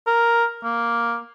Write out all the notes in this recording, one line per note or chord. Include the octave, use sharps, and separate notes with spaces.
A#4
A#3